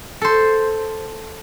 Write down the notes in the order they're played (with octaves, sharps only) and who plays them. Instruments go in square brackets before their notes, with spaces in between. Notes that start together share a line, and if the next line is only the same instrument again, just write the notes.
[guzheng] A4 C5